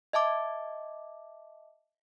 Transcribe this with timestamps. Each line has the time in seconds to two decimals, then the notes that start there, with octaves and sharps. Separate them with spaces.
0.13 D#5 E5 A5 D6